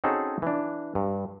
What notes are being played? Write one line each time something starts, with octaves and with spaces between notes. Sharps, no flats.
C4 C#4 D#4 F#4 G#4 A4
E3 D4
G2